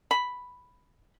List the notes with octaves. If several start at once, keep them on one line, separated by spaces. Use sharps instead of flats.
B5